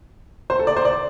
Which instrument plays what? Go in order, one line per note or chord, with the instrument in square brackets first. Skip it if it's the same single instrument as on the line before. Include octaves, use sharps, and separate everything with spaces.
[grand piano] C5
A4
D5
C5
D5